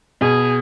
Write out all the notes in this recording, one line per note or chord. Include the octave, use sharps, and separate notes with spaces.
B2 G#4